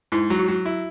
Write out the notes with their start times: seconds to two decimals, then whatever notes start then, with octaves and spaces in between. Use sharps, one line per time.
0.12 G#2 E4
0.30 F#3
0.39 F#4
0.48 F#3
0.66 E4